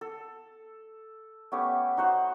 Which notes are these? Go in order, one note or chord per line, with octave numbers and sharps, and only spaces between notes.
A4
A3 B3 C#4 G4
D#4 F#4 C5 F#5